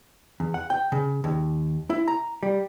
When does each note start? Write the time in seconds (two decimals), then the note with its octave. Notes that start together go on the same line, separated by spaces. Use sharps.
0.40 E2
0.54 F#5
0.70 G5
0.92 C#3
1.24 D#2
1.90 E4
2.08 A#5
2.43 G3